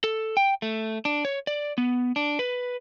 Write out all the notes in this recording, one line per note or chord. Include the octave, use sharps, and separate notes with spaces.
A4
G5
A3
D4
C#5
D5
B3
D4
B4